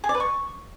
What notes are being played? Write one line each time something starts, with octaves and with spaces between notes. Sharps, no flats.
G#4
D5
B4
C#6